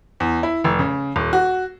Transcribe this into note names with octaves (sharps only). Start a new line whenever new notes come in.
E2
E4
F1
C#3
D#1
F#4